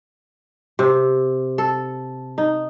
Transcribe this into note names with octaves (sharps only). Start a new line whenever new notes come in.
C3
A4
D#4